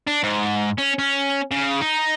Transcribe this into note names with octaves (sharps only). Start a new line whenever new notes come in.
D4
G#2
C#4
C#4
C#3
D#4